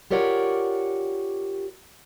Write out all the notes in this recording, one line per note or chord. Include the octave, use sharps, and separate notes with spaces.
F4 G4 A#4 C#5 D5 F#5